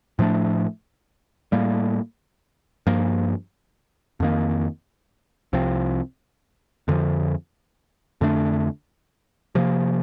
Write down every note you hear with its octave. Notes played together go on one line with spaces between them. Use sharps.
A2 F3 A3 D4
A2 G3 A#3
G2 F3 A#3
F2 D#3 A#3
C2 C3 F3 C4
F2 D3 F3
F2 D3 A3 D4
C3 F3 A#3